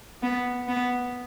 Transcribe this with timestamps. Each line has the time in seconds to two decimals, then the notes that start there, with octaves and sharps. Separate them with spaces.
0.22 B3
0.68 B3